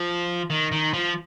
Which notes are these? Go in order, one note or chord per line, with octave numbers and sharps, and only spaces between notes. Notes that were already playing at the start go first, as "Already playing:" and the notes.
Already playing: F3
D#3
D#3
F3